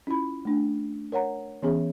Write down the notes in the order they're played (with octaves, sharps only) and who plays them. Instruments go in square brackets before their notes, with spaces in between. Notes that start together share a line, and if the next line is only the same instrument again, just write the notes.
[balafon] C#4 E4 F4 B5
A3 D4
A#4 C#5 F#5 A#5
E3 B3 C#4 G#4 C#5 E5